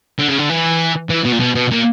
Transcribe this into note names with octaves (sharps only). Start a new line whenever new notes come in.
D3
C#3
D3
E3
E3
B2
A#2
B2
B2
A#2